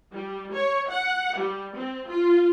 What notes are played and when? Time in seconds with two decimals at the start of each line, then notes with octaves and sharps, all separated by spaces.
0.12 G3
0.53 C#5
0.89 F#5
1.37 G3
1.76 C4
2.08 F4